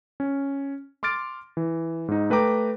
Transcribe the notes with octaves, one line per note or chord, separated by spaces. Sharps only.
C#4
C6 D6 F6 A6 D7
E3
G#2 D#4
A3 B4 G5 A#5 D6